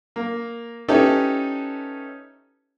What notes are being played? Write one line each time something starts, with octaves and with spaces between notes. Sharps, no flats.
A#3
C#4 D#4 E4 G4 A4 B4